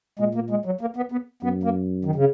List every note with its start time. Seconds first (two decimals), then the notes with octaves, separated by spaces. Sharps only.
0.19 A#2 G#3
0.35 A#3
0.50 G#3
0.66 F#3
0.81 A#3
0.97 B3
1.12 B3
1.43 F#2 B3
1.63 A#3
2.05 D#3
2.15 C#3